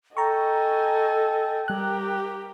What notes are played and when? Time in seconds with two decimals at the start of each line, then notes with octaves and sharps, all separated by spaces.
0.17 A4 D#5 G5 G#5 A#5 C#6
1.68 G3 G4 A#4 F#6